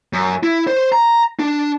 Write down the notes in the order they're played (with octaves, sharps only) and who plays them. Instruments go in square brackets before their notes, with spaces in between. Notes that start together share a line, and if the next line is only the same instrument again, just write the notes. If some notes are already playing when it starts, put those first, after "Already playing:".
[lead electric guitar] F#2
E4
C5
A#5
D4